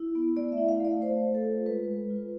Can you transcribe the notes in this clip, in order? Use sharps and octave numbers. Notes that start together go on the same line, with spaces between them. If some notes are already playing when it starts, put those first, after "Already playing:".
Already playing: E4
B3
A3 D5
E5
E4
F5
A3 D5
A3 C5
A3
A4
F4
G#3 B4
G#3
F4